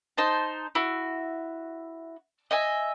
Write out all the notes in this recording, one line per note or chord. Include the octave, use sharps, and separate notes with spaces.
D#4 C5 A5
E4 F#4
D#5 E5 G#5